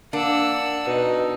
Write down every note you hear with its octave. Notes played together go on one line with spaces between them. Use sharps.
A#3 D4 F#5 E6
B2 D#4